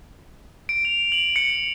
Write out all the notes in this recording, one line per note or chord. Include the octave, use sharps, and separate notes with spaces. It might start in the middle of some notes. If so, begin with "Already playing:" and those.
D7
F7
F#7
C#7